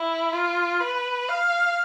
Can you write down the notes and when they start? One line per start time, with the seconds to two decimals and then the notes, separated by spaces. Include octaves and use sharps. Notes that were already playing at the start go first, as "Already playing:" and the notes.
Already playing: E4
0.33 F4
0.81 B4
1.29 F5